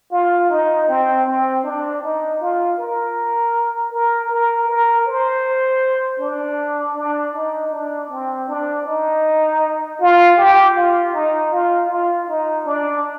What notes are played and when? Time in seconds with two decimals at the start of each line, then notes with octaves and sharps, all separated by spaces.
0.11 F4
0.49 D#4
0.88 C4
1.26 C4
1.64 D4
2.02 D#4
2.40 F4
2.78 A#4
3.92 A#4
4.29 A#4
4.68 A#4
5.06 C5
6.19 D4
6.95 D4
7.34 D#4
7.71 D4
8.10 C4
8.48 D4
8.86 D#4
10.00 F4
10.37 G4
10.75 F4
11.13 D#4
11.52 F4
11.89 F4
12.28 D#4
12.66 D4